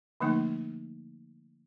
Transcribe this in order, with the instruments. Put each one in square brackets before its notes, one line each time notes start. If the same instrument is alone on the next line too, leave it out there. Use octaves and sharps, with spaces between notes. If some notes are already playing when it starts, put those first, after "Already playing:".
[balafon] D3 F3 A3 A#3 D#4